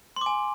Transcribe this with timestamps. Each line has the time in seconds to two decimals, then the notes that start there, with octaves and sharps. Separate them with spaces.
0.16 C6
0.21 D6
0.26 G#5